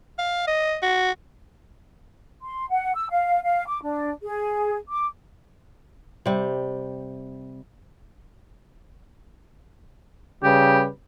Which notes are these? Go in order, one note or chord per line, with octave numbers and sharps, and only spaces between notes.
F5
D#5
F#4
C6
F#5
E6
F5
F5
D6
D4
G#4
D6
C3 G3
C#3 G3 G4 B4